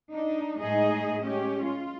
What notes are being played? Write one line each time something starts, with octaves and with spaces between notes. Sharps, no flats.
D4 D#4
A2 G#3 A3 D#4 G#4 D#5
G#3 C#4 G4
F4